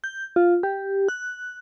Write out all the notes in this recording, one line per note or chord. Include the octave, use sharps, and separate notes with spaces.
G6
F4
G4
F#6